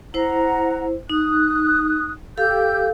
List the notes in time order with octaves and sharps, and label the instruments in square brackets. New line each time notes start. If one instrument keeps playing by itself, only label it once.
[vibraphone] E4 C5 [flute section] F#5 A#5
[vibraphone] D#4 [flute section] D#6 F#6
[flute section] G4 E6 G6 [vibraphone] A4 F5